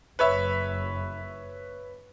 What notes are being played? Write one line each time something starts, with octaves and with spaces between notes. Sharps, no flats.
F#1 F#2 B4 C#5 E5